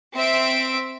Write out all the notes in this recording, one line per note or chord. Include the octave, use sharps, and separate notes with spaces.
C4 E5 D7